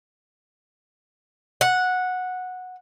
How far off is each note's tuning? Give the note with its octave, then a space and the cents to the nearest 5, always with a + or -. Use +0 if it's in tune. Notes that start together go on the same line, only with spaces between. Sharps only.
F#5 -10